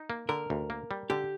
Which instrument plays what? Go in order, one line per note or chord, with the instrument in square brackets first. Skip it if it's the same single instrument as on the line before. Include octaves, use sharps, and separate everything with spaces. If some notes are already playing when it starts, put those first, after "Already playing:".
Already playing: [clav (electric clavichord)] D#4
A#3
[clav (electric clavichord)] D3 [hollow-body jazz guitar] A#4
[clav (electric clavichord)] D2
A#3
G3
[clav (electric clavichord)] D3 [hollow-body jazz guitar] G4